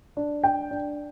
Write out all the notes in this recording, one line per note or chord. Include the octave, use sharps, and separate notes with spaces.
D4
D4 G5
D4